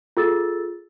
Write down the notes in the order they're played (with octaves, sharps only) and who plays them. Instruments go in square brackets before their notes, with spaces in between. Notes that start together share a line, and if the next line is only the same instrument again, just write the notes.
[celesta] F4 G#4 A4 E6 A6